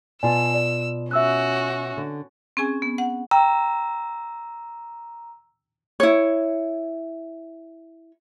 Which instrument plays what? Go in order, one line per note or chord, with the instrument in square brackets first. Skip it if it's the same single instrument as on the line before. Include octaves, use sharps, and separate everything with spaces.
[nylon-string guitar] B2 F4 A5 [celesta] D5 G#5 [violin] E6
[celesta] D5
[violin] C#4 F#4 [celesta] E5 E6 F#6
[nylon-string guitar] D3
[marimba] C4 C#4 G#4 G#5
B3
F#5
[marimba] G5 [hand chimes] A#5 E6
[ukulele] E4 C#5